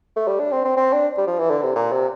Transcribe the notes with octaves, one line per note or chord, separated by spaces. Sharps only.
A3
G3
D4
C4
C4
C4
D4
G3
F3
E3
D3
C3
A#2
C3